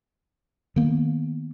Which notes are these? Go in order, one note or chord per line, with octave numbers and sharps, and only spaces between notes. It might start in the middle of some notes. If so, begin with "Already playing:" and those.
D#3 A#3 B3